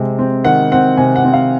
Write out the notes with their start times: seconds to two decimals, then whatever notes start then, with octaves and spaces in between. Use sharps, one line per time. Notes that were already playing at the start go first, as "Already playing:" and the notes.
Already playing: C3 G#3 C4
0.19 C4
0.45 D#3 F#5
0.72 C4 F#5
0.97 C3 G#5
1.16 F#5
1.25 C4
1.34 F5